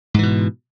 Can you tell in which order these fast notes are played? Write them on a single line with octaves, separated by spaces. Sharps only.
G#2 E3 B2